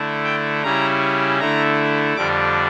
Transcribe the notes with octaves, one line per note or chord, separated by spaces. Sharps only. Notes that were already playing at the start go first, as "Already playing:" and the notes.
Already playing: D3 A3 E4
G5
C#3 G3 C#4 E4 A#5
D3 A3 E4 A#5
F2 D3 G3 D4 D6